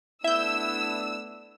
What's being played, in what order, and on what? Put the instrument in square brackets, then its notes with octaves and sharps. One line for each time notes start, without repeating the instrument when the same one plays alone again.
[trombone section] A3 B3 D4 [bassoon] E4 [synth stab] E5 G6 [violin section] E6